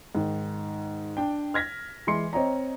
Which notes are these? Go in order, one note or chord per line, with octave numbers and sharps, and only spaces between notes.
G#2 D#3
D4 G5
F6 G#6 A#6 B6
E3 G#3 C6 C#7
C4 C#5 D#5 A#5